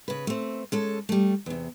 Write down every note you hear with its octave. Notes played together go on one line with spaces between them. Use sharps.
C#3 B4
A3 C4
G#3 C#4 A4
G3 A3
E2 C3